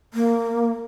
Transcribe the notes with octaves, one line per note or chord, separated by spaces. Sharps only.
A#3